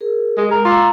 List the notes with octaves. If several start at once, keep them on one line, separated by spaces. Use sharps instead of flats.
G#4 A#4
G#3
G#3 A#4
F4 A#5 D6 E6